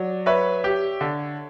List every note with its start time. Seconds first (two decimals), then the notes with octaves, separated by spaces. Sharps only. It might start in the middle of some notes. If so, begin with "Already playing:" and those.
Already playing: F#3 D5
0.26 B4 C#5 E5
0.64 G4
1.01 D3